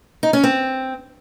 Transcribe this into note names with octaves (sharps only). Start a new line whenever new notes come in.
D#4
C#4
C4